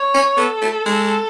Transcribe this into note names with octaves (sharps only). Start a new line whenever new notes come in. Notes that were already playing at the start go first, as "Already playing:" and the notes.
Already playing: C#5
C#4
B3 A4
A3
G#3